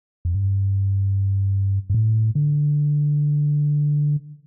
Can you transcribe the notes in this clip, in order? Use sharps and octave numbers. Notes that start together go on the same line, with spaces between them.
F2
G2
G2
A2
D3